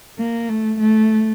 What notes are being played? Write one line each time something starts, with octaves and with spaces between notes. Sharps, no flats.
A#3
A3
A3